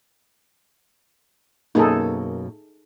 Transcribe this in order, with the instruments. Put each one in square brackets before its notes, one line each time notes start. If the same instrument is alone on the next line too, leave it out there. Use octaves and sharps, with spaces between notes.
[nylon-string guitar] F#2 B2 A#3 [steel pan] D#4 G#4 A4